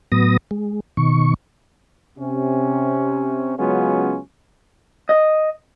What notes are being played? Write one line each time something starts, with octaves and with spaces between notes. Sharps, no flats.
A2 F#3 B3 D#6 A#6
G#3
B2 D#3 C#6
C3 C#4
C#3 F#3 G#3 B3 C#4 F4
D#5